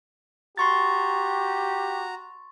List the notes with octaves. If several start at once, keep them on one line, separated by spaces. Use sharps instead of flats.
F#4 G4 A#5 C6 C#6 A6